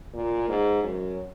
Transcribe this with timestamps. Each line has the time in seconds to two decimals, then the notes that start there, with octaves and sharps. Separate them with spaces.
0.14 A#2
0.48 G#2
0.83 F#2